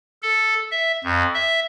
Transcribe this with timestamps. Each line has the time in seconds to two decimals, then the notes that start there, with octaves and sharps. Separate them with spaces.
0.22 A4
0.72 E5
1.04 F2
1.34 E5